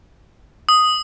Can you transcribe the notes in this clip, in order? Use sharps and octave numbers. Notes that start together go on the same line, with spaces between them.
D#6